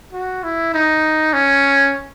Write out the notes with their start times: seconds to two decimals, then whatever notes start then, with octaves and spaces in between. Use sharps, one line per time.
0.13 F#4
0.44 E4
0.74 D#4
1.33 C#4